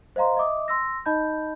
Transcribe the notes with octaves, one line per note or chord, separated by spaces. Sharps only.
C5 D#5 F5 A#5 C6
D#5 E5 D6 D#6
C6 E6 A#6
D#4 D#5 A5 B5 G6